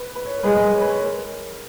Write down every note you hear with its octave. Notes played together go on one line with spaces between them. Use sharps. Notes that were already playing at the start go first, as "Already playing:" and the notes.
Already playing: B4
B4
C#5
A#4
G#3 B4
C#5
B4
C#5
A#4